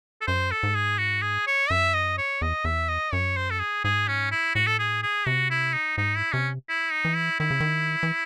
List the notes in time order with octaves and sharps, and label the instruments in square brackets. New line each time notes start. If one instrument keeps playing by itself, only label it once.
[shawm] A4
[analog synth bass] F#2 [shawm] C5
[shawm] A4
[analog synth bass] G#2
[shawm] G#4
F#4
G#4
C#5
[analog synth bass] F#2 [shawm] E5
[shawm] D#5
C#5
[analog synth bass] E2 [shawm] D#5
[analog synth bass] E2 [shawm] E5
[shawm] D#5
[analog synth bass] F#2 [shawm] C#5
[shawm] C5
A4
G#4
[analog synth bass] G#2 [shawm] G#4
[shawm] C#4
E4
[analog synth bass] A2 [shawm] F#4
[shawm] A4
G#4
G#4
[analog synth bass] C3 [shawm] F#4
[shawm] E4
D#4
[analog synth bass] G#2 [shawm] D#4
[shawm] E4
[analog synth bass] C3 [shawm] C#4
[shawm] E4
D#4
[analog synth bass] E3
[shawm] E4
[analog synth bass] D#3 [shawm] E4
[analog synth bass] C#3
D#3
E3